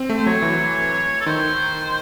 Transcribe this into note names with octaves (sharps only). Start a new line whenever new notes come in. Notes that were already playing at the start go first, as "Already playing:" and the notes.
Already playing: C4
A3
C5
F#3 C#5
E3
A4
D#3 C5